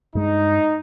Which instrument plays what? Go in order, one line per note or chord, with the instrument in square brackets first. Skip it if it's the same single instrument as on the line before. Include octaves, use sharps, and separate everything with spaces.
[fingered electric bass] G2 G#3 [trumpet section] D#4